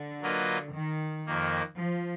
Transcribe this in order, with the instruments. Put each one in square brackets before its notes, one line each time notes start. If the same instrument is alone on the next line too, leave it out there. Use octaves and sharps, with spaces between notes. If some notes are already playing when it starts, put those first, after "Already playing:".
Already playing: [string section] D3
[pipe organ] F#3 A#3 F4 B4 D#5
[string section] D#3
[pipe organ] F2 D#3 A#3
[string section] F3